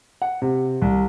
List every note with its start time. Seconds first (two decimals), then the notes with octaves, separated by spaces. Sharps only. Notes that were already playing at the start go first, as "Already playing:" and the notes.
0.22 F#5
0.42 C3
0.82 C2